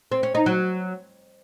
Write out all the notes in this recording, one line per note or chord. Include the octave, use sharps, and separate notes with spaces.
C4
C#4
D#4
F#3